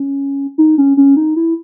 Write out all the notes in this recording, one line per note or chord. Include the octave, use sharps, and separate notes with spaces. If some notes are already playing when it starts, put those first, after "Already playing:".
Already playing: C#4
D#4
C#4
C#4
D#4
E4